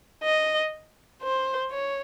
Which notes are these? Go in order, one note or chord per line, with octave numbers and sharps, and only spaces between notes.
D#5
C5
C#5